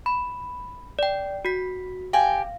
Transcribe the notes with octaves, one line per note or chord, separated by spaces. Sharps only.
B5
D5 G5
F#4 B6
G4 F5 G5 G#5